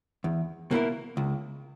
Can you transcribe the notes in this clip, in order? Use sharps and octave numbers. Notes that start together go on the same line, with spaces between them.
E2
B2 A#3 E4 A#4
C#2